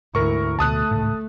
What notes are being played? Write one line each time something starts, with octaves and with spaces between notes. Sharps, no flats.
D2 G#2 E4 A#4 C#6
D1 D2 B2 A3 A5 D#6 F#6
G#1 C#2 A2